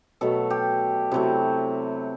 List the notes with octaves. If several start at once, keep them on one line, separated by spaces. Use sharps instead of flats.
B2 F#3 A3 A4
G4
C3 F#3 A3 E4